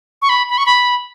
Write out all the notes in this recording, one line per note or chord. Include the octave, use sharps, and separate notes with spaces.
C#6
B5
B5
C#6
B5